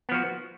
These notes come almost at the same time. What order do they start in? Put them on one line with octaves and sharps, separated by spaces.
B3 F3 F#4